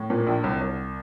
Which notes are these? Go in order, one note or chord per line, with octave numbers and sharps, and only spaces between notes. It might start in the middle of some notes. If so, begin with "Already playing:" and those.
Already playing: A2
A#2
A#1
C2
C2